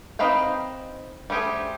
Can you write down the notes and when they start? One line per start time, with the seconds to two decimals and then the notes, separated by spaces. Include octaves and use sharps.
0.19 C4 D#4 B4 F5 G5
1.30 G3 A3 G4 G#4 C5